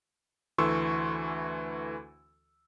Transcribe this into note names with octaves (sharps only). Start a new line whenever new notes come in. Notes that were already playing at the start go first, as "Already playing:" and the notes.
D2 E3 A4 C6 C#6 E6